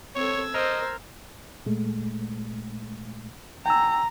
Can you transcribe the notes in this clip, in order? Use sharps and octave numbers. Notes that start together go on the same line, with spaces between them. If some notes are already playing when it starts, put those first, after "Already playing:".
C4 A4 C#5 E6 G#6 A#6
A#4 C5 D#5
A#2 G#3 A3
G5 G#5 A#5 E6